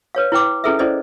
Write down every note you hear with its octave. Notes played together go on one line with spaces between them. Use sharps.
B4 C#5 F5
E4 B4 G5 D6
C#4 E4 G#4 A4 B4 E5
C#4 E4 A4 C5 D5 D#5